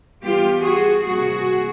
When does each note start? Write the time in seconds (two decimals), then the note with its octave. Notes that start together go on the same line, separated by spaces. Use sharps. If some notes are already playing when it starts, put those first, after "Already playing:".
0.23 E3 G3 B3 F4 G4
0.64 F#4 G#4
1.05 C3 E3 G3 A#3 F#4 G#4